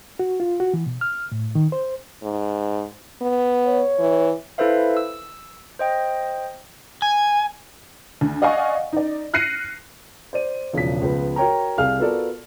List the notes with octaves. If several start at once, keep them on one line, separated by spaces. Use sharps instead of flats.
F#4
F4
F#4
E3
B2
F6
A2
D#3
C5
G#2
B3
C#5
E3
E4 A4 B4 C5 E5 F5
E6
C5 D#5 G5
G#5
D2
D5 D#5 F5 F#5 G#5 C#6
D#4 D5
F6 F#6 A#6 C7 C#7 D#7
C5 D5 D#7
E1 C#3 F3 B6
C#2 F3 B3
F#4 A#4 C#5 G5 A#5
C2 G#4 F5 F6
B3 F4 F#4 A4 A#4 D5